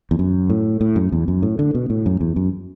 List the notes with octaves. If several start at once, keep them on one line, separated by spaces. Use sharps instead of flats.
E2
F#2
A2
A2
F#2
E2
F#2
A2
D3
B2
A2
F#2
E2
F#2